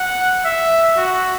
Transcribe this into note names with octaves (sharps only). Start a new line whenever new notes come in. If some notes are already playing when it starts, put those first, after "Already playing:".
Already playing: F#5
E5
F#4